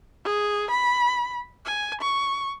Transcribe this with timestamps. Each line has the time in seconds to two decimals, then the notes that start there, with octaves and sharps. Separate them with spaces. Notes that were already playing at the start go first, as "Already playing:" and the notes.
0.25 G#4
0.70 B5
1.66 G#5
2.01 C#6